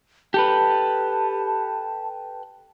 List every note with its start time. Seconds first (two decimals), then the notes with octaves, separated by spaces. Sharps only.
0.34 G4 A4 B4 A5